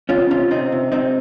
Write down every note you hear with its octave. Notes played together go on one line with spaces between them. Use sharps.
C3 C#4 F4
C3 C#4 F4
C3 C4 D#4
C3
C3 C4 D#4